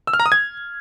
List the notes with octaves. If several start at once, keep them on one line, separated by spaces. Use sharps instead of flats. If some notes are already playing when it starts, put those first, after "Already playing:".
E6
F6
A#5
D#6
G#6